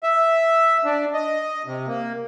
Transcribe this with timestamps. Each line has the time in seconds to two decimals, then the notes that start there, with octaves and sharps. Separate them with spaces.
0.03 E5
0.85 D4
1.14 D#5
1.66 C3
1.87 A#3